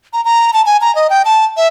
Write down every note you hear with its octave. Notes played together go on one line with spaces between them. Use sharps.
A#5
A#5
A5
G#5
A#5
D#5
G5
A5
E5